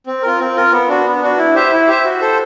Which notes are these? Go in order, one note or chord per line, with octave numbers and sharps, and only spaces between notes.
C4
F4 A#4
C4
F4 A#4
B3
D4 F#4
B3
D4 F#4
E4
G4 C5 E5
E4
G4 C5 E5
F#4
A4 C5